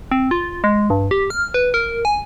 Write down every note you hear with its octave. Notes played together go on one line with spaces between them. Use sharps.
C4
F4
G#3
G2
G4
F6
B4
A#4
G#5